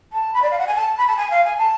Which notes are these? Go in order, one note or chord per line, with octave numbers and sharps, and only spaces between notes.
A5
B5
D5
F5
F#5
G#5
A5
B5
A5
G#5
F5
G#5
A5